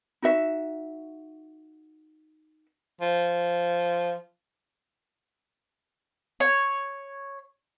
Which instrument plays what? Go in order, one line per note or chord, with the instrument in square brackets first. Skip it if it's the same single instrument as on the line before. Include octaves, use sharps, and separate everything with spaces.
[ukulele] D#4 F#4 E5
[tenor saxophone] F3
[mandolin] C#5